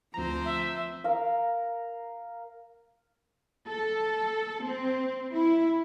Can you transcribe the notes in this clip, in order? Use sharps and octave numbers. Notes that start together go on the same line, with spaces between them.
D2 F3 C4 C5 A#5
E5
A#4 F5
A4
C4
E4